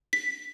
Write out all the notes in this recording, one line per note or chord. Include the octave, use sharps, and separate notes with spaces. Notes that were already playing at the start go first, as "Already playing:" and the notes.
B6